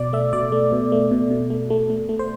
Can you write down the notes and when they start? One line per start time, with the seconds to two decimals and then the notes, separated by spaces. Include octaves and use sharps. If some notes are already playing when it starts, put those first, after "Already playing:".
Already playing: B2 D5
0.13 A3 E5
0.33 B2 D5
0.52 A3
0.72 B2
0.92 A3
1.11 B2
1.31 B2
1.50 A3
1.70 A3
1.90 A3
2.09 A3
2.19 C5